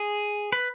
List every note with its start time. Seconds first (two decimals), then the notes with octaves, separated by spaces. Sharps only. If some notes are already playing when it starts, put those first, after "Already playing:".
Already playing: G#4
0.52 B4